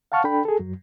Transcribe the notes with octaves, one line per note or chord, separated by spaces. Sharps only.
F5 F#5 A5 C#6 F6
D4 A4 G5 B5
G#4 A4
F#2 F#3